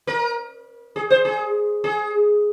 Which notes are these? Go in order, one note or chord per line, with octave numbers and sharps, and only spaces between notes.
A#4
G#4
C5
G#4
G#4